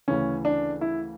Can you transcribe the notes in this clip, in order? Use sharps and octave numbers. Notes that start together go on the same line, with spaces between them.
D2 C#3 E3 C#4
D4
E4